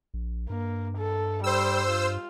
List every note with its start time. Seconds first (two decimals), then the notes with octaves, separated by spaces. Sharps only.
0.14 A#1
0.50 G2 A#3
0.97 A4
1.44 G3 C5 E6
1.90 F4